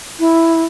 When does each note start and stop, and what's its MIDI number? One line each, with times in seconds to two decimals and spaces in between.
0.19 0.62 64